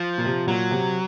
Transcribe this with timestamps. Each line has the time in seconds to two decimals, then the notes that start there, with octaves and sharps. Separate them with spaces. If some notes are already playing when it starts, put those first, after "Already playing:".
Already playing: F3
0.18 A#2
0.25 C3
0.47 A#2 F#3
0.71 C3